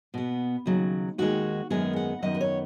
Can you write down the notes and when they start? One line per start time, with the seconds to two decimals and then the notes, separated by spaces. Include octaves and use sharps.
0.14 B2 B3
0.66 D#2 C#3 F#3
1.18 D#2 D#3 G#3 F#4
1.70 F#2 D#3 G#3 B3 G#4
1.96 F#5
2.22 F#2 D#3 B3 D#5
2.35 B4
2.41 C#5